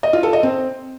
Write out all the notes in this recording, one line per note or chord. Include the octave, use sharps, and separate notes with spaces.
D#5
F4
A4
D#5
C4